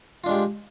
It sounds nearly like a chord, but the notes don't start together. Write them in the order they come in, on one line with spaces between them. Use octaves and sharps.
F4 D4 G#3 G4